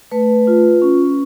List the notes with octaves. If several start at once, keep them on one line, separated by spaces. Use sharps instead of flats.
A3 B4
F4
C#4